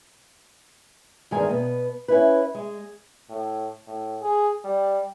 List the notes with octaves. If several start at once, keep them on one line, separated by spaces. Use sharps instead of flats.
E2 G2 D#3 G#3 G#5 A#5
B2 B3
C#4 E4 B4
G#3
A2
A2
G#4
G3